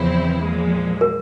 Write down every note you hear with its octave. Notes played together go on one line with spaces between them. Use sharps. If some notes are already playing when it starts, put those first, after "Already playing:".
Already playing: E2 C#3 F3 C4 E4
A#2 F3 G#3
A#4